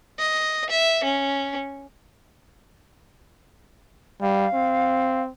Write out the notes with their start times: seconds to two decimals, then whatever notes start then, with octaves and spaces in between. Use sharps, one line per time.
0.19 D#5
0.69 E5
1.04 C#4
4.22 G3 F5
4.54 C4